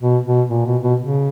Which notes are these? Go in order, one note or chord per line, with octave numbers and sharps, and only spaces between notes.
B2
B2
A#2
B2
B2
C#3